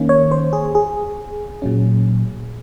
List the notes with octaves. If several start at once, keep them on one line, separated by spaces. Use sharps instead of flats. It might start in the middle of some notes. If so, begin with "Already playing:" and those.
Already playing: D#3 A#3 C#4
C#5
C5
G#4
G#4
A#2 F#3 C#4